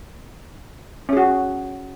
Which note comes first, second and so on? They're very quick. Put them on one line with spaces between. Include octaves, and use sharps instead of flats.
C#4 G#4 F#4